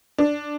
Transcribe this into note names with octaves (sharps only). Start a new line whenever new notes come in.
D4